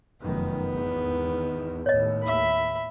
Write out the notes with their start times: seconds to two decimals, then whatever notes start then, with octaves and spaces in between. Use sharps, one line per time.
0.22 F1 F#2 D#3 B3
0.69 G#1 E2 D#3
1.86 D#2 A2 C#5 D#5
2.23 E5 B5